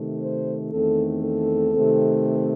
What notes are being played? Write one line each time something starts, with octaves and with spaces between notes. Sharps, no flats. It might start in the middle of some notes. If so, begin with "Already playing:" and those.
Already playing: C3 D#3 A3
C5
E2 D#3 A3 C4 A4
A4
C3 D#3 A3 C4